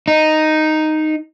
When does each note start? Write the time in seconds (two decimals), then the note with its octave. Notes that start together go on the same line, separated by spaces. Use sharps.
0.08 D#4